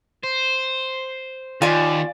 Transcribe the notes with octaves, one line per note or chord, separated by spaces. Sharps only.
C5
D#2 F4 D5 G#5